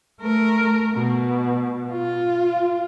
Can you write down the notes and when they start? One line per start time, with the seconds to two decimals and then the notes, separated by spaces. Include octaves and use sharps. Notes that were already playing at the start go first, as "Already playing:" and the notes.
0.21 A3 A#4
0.94 B2
1.91 F4